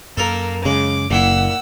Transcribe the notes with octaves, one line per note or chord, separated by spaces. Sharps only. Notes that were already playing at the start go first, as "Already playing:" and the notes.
F#2 A#3 A4 A#4
C#3 G#3 D6
F#1 A#2 E4 F#5 E6